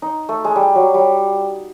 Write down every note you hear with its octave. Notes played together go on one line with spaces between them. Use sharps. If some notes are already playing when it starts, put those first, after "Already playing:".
D#4
A3
G#3
G3
F#3
G3